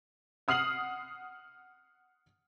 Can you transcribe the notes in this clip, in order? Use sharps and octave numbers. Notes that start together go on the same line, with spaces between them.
F#5 D#6 F6 C7 F#7